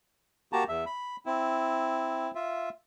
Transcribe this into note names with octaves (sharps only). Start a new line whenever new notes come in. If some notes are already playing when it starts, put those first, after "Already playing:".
A#3 F#4 G4 A5 A#5
E2 E5
B5
C4 E4
F4 E5